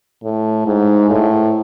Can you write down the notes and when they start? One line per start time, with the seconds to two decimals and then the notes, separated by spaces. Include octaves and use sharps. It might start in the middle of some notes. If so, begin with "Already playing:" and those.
0.24 A2
0.67 G#2
1.10 A2